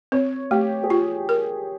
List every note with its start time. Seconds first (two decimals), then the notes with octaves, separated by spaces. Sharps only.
0.12 C4 C#5
0.51 A3 G4
0.84 G#4
0.90 F4 G4
1.29 A#4